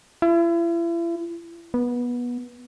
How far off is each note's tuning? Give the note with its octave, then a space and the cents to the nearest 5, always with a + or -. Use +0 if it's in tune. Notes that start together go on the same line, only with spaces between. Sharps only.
E4 +40
B3 -20